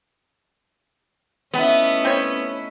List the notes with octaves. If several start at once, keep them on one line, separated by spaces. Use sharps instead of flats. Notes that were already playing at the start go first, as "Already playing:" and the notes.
A3 B3 C#4 D#4 E4
C4 B4 C#5